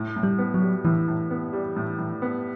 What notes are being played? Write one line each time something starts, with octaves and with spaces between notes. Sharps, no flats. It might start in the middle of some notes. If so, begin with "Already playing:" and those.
Already playing: A2
A2
G3
B3
F#3
G3
A2 E3
A2
B3
G3
A2
A2
B3